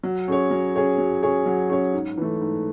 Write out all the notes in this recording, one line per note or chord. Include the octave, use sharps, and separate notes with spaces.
F#3
C#4 G#4 C#5
F#3
C#4 G#4 C#5
F#3
C#4 G#4 C#5
F#3
C#4 G#4 C#5
G#2
E3 A3
G#2